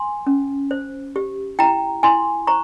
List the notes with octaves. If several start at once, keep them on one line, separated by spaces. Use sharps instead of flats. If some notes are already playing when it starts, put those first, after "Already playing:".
Already playing: G#5 C6
C#4
C5
G4
E4 G5 A#5
E4 G#5 C6
C5 A#5 C#6